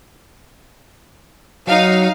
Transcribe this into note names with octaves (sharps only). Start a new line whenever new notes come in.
F#3 D#4 F5